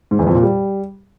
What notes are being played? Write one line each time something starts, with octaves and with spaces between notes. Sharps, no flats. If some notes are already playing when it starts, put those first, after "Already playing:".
G#2
E2
F2
A#2
G3